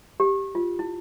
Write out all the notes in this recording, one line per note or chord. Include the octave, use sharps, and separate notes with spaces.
G4
F4
E4